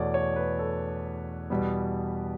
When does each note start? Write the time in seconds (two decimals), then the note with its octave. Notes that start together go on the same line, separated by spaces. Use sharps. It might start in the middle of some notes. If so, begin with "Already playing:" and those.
Already playing: E2 B2 A3 C#5 D5
0.14 C#5
0.36 B4
0.59 A4
1.50 E2 B2 G3 B3